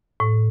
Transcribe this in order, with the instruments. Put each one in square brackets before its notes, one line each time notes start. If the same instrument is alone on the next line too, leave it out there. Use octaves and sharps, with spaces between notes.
[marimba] A2